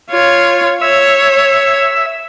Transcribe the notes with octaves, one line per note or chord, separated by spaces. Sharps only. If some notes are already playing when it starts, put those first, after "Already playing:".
F4 C#5
C#5 E5